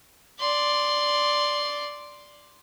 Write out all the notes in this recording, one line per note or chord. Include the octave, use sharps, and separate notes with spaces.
D5 C6